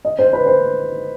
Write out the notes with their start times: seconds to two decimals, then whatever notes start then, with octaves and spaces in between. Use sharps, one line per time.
0.05 D#5
0.19 C5
0.33 B4
0.46 C5